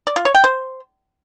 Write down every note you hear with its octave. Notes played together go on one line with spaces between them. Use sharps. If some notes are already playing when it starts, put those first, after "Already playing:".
D5
F4
C#5
G5
C5